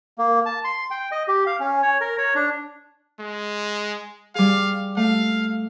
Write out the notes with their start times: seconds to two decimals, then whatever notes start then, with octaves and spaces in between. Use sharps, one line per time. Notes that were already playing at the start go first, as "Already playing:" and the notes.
0.18 A#3
0.46 A5
0.65 C6
0.91 G5
1.12 D#5
1.28 G4
1.47 F5
1.60 C#4
1.82 C#5
2.01 A#4
2.18 C#5
2.35 D4
3.20 G#3
4.35 G3 G#4 F5
4.97 A3 F5